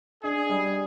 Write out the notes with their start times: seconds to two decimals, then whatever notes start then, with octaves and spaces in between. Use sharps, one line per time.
0.24 D4 G#4
0.50 G3